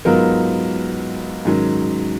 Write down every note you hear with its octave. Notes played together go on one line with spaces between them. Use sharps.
G#2 F#3 B3 F4 A#4
G#2 D#3 F#3 C#4